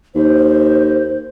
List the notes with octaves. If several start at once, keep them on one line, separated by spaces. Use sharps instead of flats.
D#2 C5